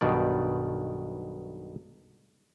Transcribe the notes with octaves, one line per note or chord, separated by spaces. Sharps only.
B1 G2 B2 D#3 D5